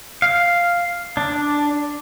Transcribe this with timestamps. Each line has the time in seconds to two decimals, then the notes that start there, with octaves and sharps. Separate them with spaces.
0.22 F5
1.17 D4